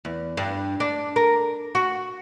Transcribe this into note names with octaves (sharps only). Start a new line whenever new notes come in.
E2
G2
D4
A#4
F#4